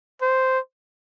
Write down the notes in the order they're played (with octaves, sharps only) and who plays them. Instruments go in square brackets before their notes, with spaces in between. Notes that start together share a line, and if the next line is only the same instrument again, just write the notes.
[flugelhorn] C5